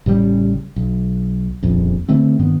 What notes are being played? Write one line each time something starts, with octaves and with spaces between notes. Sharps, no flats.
A1 C#3 F#3 G3
B1
D#1 A#1 F2
D3 E3 A3 C4
G2 D#3 B3